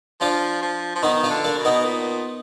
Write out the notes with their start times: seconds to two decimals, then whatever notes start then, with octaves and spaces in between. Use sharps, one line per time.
0.21 F3 D4 F4
0.63 F3
0.96 F3
1.03 D#3 B3 D#4
1.23 D4 F4
1.30 D3
1.44 A#3 D4
1.58 B2
1.65 B3 D#4
1.85 A#2